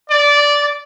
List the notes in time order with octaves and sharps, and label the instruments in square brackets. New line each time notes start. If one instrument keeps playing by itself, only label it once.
[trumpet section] D5